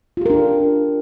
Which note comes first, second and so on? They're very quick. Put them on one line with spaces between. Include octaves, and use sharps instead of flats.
F4 G4 A#4 D4